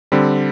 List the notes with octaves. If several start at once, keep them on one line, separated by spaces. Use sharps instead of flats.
D3 G3 C4